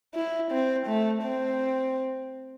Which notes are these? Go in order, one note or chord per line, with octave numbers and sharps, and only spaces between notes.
E4
C4
A3
C4